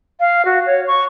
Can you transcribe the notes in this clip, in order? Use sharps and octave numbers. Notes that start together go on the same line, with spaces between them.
F5
F#4
C#5
C#6